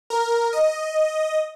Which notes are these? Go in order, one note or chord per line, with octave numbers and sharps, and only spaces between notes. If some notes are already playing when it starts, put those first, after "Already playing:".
A#4
D#5